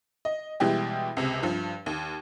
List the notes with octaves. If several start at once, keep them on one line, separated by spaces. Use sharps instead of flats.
D#5
B2 E3 G3 G#3 E4 G4
C#2 C3
G2 F3
D#2